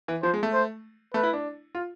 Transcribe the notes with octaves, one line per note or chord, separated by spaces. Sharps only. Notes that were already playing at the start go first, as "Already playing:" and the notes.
E3
F3 C5
G#3
A3
C5
A3 B4
E4
D4
F4